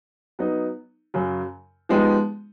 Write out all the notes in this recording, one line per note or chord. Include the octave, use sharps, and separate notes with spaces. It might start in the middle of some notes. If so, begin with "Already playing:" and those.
F#3 B3 D#4
F#2 C#3 F#3
F3 G#3 B3 D#4 G4